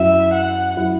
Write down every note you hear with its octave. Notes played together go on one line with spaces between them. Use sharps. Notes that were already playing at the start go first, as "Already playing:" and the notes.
Already playing: F#2 F#3 E4 E5
F#5
F#3 E4